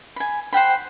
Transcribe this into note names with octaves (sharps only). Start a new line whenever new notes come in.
G#5 B5
C5 F#5 G5 B5